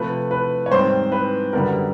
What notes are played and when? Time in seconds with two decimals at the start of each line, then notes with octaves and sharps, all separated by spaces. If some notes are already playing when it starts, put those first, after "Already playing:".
Already playing: C3 F3 A3 B4
0.31 B4
0.66 C#5
0.71 G#2 D#3 G3 C4 C5
1.12 B4
1.53 F#2 D3 G3 B3 A#4